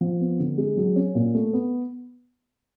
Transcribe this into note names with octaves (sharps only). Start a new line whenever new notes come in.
F3
B3
D3
G#3
F#3
C#4
A#2
A3
B3